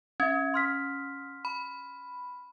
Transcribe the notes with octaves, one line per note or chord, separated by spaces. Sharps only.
C#4 E5 G#6
C6 F6 B6
B5